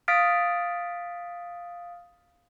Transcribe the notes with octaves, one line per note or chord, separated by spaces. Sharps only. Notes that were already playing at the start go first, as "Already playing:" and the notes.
F5 D#6 F6 A6 B6 D7